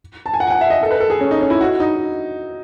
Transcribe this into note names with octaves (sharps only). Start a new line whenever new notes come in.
A5
G#5
F#5
G#5
F#5
E5
D#5
A4
B4
A4
G#4
C#4
D#4
C#4
E4
F#4
D#4